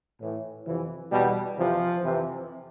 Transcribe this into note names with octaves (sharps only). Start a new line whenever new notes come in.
A2 E3
F2 C3 E3
E2 B2 G3
F2 C3 E3 F3
F2 C3 E3